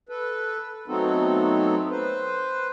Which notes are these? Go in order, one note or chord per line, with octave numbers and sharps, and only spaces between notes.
A4 B4
F#3 A3 B3 C4 D#4 A4
B4 C5